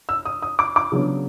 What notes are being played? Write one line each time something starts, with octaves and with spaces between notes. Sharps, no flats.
E6
D#6
D#6
D6
D6
C#3 F#3 B3 D4